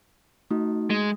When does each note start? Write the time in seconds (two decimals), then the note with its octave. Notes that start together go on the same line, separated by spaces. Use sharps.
0.51 A3 D#4 F#4
0.90 G#3